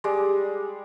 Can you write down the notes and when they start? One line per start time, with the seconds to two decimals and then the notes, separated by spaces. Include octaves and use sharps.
0.04 G3 G#3 D6